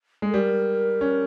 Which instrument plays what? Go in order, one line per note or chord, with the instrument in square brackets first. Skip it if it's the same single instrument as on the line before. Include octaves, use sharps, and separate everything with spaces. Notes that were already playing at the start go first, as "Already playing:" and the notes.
[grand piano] G#3
[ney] A4
[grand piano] G3 [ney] A#4
[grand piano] C#4